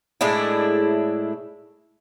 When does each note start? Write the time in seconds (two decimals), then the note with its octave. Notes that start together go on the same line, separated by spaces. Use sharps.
0.21 A2 G#3 D4 E4